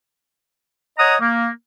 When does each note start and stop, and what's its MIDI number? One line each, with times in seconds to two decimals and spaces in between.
0.98 1.15 73
0.98 1.15 75
0.98 1.15 78
0.98 1.15 82
0.98 1.15 87
1.20 1.48 58